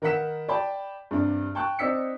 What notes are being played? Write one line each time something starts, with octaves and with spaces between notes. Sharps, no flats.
D#3 A#4 B4 F#5 B6 E7
D5 G5 A5 B5
G2 C3 D4
G5 A5 C#6 F#6
C4 D#4 D5 E6 B6 C#7